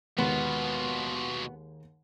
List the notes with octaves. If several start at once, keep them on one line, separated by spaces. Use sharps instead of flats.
D#2 B2 G#3 B3 F4 C6